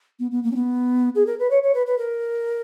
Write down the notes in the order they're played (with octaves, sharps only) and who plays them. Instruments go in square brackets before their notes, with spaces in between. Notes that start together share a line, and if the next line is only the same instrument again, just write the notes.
[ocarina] B3
B3
A#3
C#4
B3
G#4
A#4
B4
C#5
C#5
B4
B4
A#4